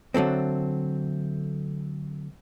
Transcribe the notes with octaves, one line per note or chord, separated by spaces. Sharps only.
D3 F#3 A3 C4